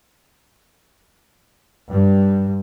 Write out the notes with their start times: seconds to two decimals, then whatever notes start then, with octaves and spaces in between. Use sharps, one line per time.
1.90 G2